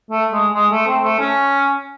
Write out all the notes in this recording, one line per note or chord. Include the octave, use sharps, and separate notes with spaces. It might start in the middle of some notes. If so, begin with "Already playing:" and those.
A3
G#3
G#3
A3
C4
A3
C#4